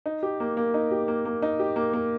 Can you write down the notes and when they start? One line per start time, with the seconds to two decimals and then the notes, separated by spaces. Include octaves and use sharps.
0.06 D#4
0.23 G4
0.40 A#3
0.57 A#3
0.74 D#4
0.91 G4
1.08 A#3
1.25 A#3
1.42 D#4
1.60 G4
1.76 A#3
1.93 A#3